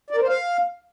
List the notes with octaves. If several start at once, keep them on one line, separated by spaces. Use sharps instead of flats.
D5
A#4
C5
F5